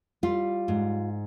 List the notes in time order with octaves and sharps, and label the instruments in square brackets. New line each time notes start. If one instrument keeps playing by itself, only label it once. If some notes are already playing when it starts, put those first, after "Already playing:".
[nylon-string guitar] G3 F4
G#2